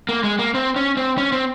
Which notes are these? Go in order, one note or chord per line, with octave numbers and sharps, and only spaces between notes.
A#3
G#3
A#3
C4
C#4
C4
C#4
C4